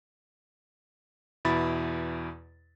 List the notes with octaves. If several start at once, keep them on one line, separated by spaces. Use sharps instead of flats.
E2 B2 E4 B5 A6